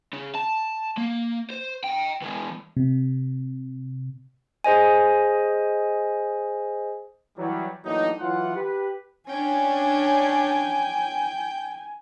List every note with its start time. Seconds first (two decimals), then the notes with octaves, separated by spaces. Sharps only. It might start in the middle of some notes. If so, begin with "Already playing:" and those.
0.13 C#3
0.35 A5
0.97 A#3
1.50 C5
1.84 D#5 G5
2.22 E3 G#3
2.77 C3
4.64 G#4 C5 D#5 G#5
7.37 E3 F#3 G3
7.85 A2 E3 F#3 A#3 D4 D#4
8.20 E3 F#3 F4 F#5
8.56 G4 B4
9.30 C#4 D4 G5 G#5